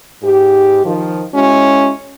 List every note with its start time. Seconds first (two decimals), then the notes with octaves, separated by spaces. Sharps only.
0.22 G#2 G4
0.85 D#3 F3
1.34 G#3 C#4 E4 F#4